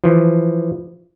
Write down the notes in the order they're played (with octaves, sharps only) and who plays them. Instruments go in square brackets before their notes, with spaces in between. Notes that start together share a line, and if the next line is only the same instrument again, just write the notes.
[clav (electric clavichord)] E3 F3